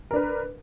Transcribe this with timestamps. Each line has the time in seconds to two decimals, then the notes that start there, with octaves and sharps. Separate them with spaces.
0.11 A#4
0.13 D4
0.16 B4